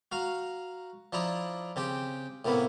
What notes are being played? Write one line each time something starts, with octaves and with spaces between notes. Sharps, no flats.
F#4 F5 A#5
F3 D4 E4 A#5 D#6
C#3 C4 G4 G5
A2 C3 A#3 B3 E4